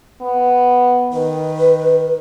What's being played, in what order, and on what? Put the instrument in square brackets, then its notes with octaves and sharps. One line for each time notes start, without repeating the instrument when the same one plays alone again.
[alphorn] B3
[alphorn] D#3 [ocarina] B4